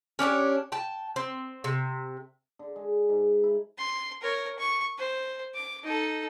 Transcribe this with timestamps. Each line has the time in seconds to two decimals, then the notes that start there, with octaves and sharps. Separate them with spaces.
0.19 C#4 D4 G4 C#5
0.72 G5 A5
1.16 C4
1.64 C3
2.59 D3
2.76 G#3
3.09 G#2
3.43 E4
3.78 C6
4.22 A#4 C#5
4.59 C#6
4.98 C5
5.55 D6
5.84 D#4 A4